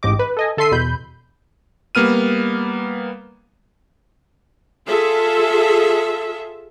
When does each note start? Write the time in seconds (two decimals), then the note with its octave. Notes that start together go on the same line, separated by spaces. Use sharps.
0.03 A1 G#2 G4 D#5 D6
0.19 B4
0.37 A4 D#5 G#5
0.57 D3 A4 E5 C6 C7 D#7
0.71 E2 B2 B5 G6
1.95 G3 A#3 B3 F6 D#7
4.86 F4 G#4 A4 E5